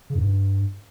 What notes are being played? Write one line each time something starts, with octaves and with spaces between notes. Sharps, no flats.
C#3
F#2
G2